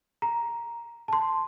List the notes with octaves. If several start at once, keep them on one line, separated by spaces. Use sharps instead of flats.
A#5
A5 C6